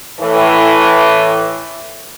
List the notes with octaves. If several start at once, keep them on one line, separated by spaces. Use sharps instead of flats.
A2 E3